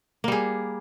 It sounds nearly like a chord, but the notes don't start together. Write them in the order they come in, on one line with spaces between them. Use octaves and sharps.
A#3 G3 G#4